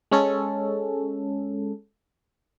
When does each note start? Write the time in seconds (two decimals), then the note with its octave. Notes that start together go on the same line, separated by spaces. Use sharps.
0.12 G#3 C#4 A4